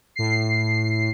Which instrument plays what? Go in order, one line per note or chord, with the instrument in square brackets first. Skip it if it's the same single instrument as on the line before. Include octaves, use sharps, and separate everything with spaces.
[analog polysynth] A2 C7